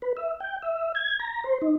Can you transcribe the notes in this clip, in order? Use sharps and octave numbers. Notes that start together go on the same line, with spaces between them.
B4
E5
G5
E5
G#6
A#5
C5
D#4